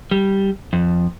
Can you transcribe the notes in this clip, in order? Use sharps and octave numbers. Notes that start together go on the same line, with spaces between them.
G3
F2